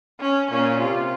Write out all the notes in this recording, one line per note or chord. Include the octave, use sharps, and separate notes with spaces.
C#4
A#2 C#4
C3 F4